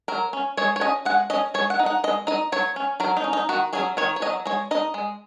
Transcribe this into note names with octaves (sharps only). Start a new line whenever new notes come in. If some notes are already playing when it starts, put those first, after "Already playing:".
F#3 A#4
C#4
G#3 C#5
C#5
C#4 D#5
G#3 F#5
C#4 D#5
G#3 C#5
F#5
D#4
F#5
G#3 D#5
D#4 D#5
F#3 C#5
C#4
F#3 A#4
D#4
C#4
D#4
D#3 F#4
F#3 C#4 G#4
D#3 C#5
C#5
C#4 D#5
F#3
G#3 C#5
D#4 D#5
G#3